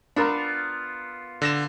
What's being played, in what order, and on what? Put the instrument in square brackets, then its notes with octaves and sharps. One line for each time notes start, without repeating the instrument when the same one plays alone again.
[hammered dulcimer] B3 F4 [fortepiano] D4 A#4 A#5
[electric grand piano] D3 A#6 E7